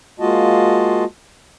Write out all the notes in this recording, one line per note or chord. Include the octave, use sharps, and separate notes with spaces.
G#3 A#3 F4 F#4 D#5 A5